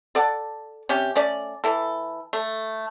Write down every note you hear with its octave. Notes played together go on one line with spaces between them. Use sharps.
A4 D5 F#5 A5
C3 C#4 G4
A3 C#4 D5
E3 E4 A4
A3